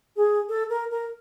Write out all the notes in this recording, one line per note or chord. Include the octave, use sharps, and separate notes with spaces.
G#4
A4
A#4
A#4